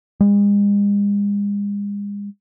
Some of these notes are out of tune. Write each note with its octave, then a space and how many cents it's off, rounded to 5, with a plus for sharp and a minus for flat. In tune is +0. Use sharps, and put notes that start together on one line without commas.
G#3 -40